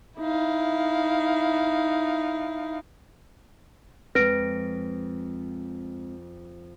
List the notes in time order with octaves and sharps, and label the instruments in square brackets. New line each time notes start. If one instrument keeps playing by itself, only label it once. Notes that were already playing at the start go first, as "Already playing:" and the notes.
[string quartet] D#4 E4 F5
[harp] F2 [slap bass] G#3 C4 [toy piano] B4 [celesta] A#6 D7